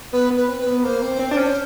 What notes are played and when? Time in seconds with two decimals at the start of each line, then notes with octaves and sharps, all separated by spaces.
0.13 B3 B4
0.30 B3
0.37 B4
0.48 C4
0.60 B4
0.66 B3
0.84 A#3 C5
1.02 C4
1.19 C4
1.32 D4
1.37 C#4